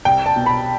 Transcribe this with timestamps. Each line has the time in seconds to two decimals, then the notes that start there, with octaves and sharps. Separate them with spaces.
0.05 C2 G5
0.26 A5
0.36 B2
0.46 B5